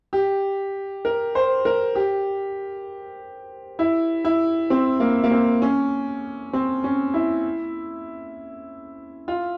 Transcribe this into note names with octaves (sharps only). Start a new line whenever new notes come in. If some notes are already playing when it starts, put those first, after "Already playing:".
G4
A#4
C5
A#4
G4
E4
E4
C4
A#3
A#3
C4
C#4
C4
C#4
E4
F4